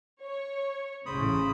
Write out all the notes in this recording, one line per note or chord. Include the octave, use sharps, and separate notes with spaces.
C#5
A1 C#3 C5 B5 D#6